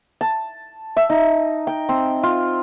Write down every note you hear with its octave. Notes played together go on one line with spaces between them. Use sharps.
A5
E5
D#4
G5
C4
F4